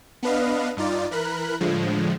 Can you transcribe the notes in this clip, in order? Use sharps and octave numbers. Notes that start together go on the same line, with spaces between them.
B3 D4 B4 D#5 F5
G2 D#4 F4 D5
E3 A#4 B5 F#6
A2 D3 F3 G#3